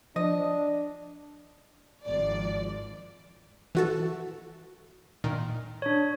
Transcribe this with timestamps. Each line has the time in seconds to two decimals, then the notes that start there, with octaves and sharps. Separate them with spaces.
0.16 F3 D4 D#5
2.03 G#1 F3 D5
3.75 E3 F#4 A4
5.24 A#2 D#3
5.82 D4 C#5